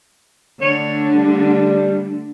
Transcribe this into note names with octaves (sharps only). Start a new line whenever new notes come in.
D3 A3 D4 C#5
G3